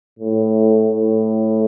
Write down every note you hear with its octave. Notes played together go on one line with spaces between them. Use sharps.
A2
A2